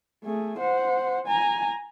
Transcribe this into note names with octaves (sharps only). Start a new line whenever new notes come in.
A3 G#4
C5 F#5
G#5 A#5